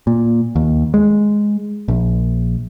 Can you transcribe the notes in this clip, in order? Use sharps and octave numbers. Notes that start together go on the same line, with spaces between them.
A#2
D#2
G#3
A#1